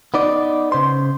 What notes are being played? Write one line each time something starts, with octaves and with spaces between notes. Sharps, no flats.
B3 D#4 D5
C#3 C5 C6